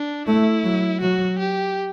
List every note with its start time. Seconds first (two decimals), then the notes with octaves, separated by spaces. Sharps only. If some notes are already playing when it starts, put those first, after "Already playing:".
Already playing: D4
0.27 A3 E4
0.64 F#3
1.01 F#3 F#4
1.39 G4